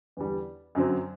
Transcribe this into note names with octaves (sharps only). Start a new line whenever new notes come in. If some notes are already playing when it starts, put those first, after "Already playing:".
E2 D3 G3
F#2 D3 F#3 C4